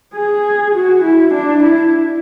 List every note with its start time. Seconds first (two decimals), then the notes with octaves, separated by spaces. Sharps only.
0.15 G#4
0.74 F#4
1.04 E4
1.34 D4
1.63 E4